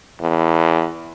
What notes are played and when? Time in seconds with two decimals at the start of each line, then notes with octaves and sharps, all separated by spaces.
0.21 E2